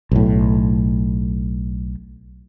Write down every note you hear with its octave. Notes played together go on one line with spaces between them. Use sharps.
B1 A2